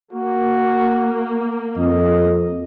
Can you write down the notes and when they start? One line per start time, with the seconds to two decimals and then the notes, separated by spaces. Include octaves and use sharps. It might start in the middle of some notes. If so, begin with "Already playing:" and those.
0.13 A#3 F#4
1.77 F2 D#5